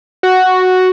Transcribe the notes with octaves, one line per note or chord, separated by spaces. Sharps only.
F#4